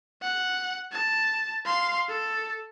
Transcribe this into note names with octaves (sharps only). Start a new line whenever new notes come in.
F#5
A5
F5 C6
A4